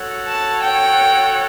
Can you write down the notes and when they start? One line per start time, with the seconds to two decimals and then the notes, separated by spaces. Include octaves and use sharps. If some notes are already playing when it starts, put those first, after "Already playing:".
Already playing: F#4 A4 C#5 F#5
0.28 A5
0.63 G5